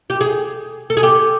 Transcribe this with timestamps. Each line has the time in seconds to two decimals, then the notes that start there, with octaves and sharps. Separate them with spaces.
0.10 G4
0.21 G#4
0.90 A4
0.97 G#4
1.03 G4